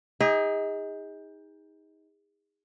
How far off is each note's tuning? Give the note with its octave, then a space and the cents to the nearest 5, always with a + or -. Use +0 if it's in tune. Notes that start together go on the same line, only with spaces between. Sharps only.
D#4 +25 G#4 -35